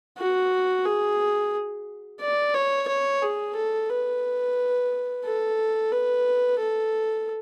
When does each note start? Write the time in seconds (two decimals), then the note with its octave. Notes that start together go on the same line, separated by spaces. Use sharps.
0.18 F#4
0.85 G#4
2.20 D5
2.54 C#5
2.88 C#5
3.22 G#4
3.56 A4
3.89 B4
5.24 A4
5.92 B4
6.59 A4